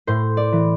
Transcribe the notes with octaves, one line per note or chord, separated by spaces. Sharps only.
A2 C5
D5
E3